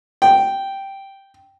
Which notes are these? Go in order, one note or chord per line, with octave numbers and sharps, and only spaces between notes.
G5